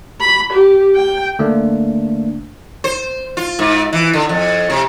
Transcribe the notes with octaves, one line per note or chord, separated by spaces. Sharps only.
B5
G4
G5
D3 A3 A#3 D4
C5
F4
G#2
E3
D3
F2
C3